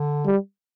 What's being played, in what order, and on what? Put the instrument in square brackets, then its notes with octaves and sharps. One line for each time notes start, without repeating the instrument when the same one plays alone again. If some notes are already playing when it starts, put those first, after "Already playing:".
Already playing: [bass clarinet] D3
[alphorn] G3